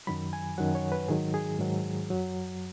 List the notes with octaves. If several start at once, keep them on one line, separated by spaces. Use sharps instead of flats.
F#2 D#3 F#3 B5
G#5
F#2 D#3 F#3 F#5
C#5
B4
G#2 D#3 F#3 G#4
G#4
G#2 D#3 F#3
F#2 F#3